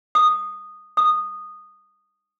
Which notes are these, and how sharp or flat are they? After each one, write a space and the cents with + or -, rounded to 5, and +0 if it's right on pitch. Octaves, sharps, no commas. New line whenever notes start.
D#6 -10
D#6 -15